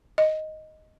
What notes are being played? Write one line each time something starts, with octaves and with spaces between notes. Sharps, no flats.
D#5